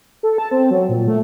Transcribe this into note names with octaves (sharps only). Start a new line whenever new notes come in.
A4
A5
C4
F#3
A#2
A3